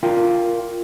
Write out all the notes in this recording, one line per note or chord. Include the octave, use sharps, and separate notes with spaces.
F4 A#4 F5 G5